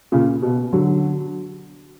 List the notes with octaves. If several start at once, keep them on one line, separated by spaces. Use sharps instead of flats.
A#2 C#3
B2
D3 F#3